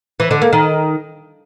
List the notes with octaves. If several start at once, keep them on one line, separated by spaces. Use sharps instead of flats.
E3
D3
A#3
D#3